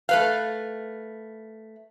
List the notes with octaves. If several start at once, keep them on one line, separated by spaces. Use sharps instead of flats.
A3 B4 F5